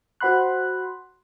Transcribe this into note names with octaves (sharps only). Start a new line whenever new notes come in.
F#4 C5 F#5 B5 C6 F#6